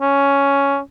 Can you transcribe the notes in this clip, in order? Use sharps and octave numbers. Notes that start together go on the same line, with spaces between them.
C#4